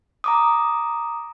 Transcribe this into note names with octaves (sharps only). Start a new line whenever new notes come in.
A#5 D6 D#6